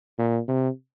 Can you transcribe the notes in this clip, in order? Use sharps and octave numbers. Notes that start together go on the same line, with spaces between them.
A#2
C3